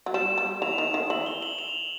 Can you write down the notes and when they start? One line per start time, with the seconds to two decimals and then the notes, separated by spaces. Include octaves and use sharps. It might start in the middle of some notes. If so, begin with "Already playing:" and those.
0.06 F#3
0.14 G3 E7
0.38 G3
0.62 E3 F7
0.78 D#3
0.94 D#3
1.10 E3 F#7
1.26 G7
1.42 F#7
1.59 F7